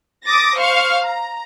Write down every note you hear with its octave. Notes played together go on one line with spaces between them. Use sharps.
D6 D#6 A6 A#6
C5 F5 C#6 F6
A#5